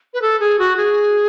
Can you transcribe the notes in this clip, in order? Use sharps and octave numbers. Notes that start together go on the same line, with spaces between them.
B4
A4
G#4
F#4
G#4